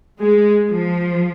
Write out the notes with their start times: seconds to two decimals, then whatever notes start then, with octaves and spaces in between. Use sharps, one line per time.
0.20 G#3
0.70 F3